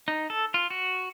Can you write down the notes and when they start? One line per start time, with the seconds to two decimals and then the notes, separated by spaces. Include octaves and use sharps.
0.08 D#4
0.30 A4
0.54 F4
0.70 F#4